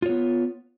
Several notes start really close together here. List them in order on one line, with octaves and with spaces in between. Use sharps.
F4 C#5 B3